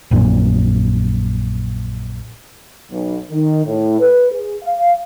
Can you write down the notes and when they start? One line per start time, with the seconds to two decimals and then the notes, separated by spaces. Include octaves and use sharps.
0.11 A#1 F#2 A#2
2.91 B1
3.31 D#3
3.65 A2
4.00 B4
4.32 G#4
4.64 F5